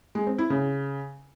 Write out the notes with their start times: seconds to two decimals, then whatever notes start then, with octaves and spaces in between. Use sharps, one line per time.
0.15 G#3
0.27 C4
0.38 E4
0.50 C#3